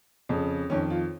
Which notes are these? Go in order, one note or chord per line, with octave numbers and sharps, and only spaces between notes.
F2 C#3
F2 D#3 C#4
F4